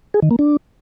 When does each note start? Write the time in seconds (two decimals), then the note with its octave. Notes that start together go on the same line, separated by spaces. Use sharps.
0.14 G#4
0.22 D#3
0.31 A#3
0.39 D4